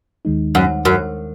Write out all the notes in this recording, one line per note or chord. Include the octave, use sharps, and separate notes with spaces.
D#2 D#3 G#3 D#4
F#2
F#2